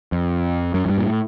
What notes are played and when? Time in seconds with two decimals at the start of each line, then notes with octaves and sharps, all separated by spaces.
0.12 F2
0.74 F#2
0.86 F#2
0.89 G2
0.98 A#2
1.06 A2